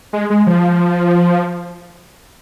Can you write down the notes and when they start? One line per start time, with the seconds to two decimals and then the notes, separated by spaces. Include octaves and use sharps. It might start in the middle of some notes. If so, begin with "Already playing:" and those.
0.13 G#3
0.30 G#3
0.47 F3